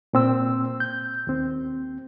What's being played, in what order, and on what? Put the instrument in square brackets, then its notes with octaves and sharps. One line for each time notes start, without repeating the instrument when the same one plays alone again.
[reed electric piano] A#2 C4 E6
G6
D#2 C4